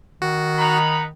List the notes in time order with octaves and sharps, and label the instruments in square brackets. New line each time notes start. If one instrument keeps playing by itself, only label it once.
[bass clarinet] D#3 [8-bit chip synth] F#4
[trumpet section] D#4 F#5 B5 [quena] A#5